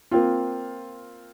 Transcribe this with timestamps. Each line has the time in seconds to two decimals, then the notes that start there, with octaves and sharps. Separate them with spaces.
0.11 A#3 C4 F4